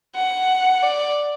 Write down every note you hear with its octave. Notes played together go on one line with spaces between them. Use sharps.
F#5
D5